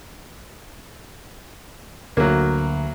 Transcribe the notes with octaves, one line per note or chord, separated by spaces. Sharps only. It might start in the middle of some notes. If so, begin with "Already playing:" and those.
D2 F#3 A#3